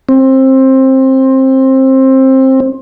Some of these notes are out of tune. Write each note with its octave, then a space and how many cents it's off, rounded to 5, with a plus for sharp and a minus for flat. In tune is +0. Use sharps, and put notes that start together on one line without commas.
C4 +20